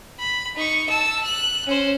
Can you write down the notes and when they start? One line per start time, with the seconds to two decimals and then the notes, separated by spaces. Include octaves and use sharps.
0.19 B5
0.56 D#4 C#6
0.89 A5 E6
1.24 F#6
1.67 C#4 C5